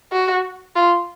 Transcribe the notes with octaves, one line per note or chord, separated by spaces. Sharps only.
F#4
F4